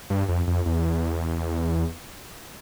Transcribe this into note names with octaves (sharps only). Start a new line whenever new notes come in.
G2
F2
F2
E2